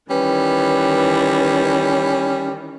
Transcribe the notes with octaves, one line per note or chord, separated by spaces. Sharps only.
D#3 E3 G3 C#4 B4